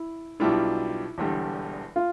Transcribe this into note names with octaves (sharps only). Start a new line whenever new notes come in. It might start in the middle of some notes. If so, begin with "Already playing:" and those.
Already playing: E4
B1 B2 G3 D4 E4 F4
E1 E2 D3 G3
F4